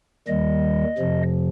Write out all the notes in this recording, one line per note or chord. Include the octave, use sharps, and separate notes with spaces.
D#2 D#3 G3 D#5
F2 C3 F3